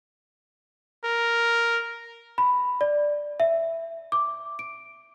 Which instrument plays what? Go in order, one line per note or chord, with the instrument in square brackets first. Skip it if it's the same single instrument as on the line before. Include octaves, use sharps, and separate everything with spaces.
[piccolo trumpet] A#4
[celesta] B5
D5
E5
D6
D7